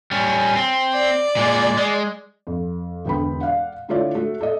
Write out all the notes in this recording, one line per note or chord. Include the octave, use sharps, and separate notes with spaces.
G3 C#4
C4
D5
A#2 G#3
G#3
F2
E1 D2 B3 G5 B5
D5 F5 F#5
D3 A3 E4 F4 C#5 D5
A3 F#4
A4 D5 D#5